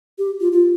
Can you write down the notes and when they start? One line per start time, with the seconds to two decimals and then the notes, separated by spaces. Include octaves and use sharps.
0.18 G4
0.41 F4
0.52 F4